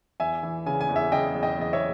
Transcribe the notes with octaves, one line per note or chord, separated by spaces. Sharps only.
E2 E5 G#5
E3
C#3 G#5
G#5
E2
E5 G#5
C#3 D#5 G5
E2
D#5 G5
E2 D#5
C#5 E5